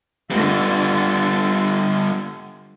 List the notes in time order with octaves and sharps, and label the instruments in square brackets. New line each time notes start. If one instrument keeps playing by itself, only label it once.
[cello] D3 F4 [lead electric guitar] G3 B3